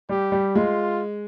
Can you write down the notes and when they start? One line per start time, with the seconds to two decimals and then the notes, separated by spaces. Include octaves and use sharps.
0.09 G3 G4
0.32 G3
0.55 G#3 F4